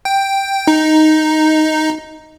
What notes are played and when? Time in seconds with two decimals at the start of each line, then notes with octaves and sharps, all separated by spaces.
0.05 G5
0.67 D#4